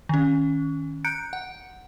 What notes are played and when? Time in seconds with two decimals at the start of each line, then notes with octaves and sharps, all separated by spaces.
0.09 D#3 C#4
1.05 A#5 F#6 G6 C#7 D7
1.33 F#5